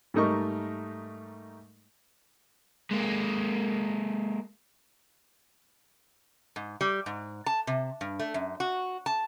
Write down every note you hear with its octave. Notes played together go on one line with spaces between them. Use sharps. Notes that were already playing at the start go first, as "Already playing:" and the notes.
G#2 G3 A3 D#4 A#4 C#6
G#3 A#3
G#2
G3
G#2
A5
C3
G2
A3
F#2
F#4
A5